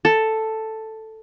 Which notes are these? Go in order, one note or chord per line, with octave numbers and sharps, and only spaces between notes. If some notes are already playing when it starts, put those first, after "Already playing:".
A4